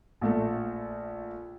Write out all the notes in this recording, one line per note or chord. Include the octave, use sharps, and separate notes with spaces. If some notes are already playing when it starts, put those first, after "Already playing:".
A#1 A3 A4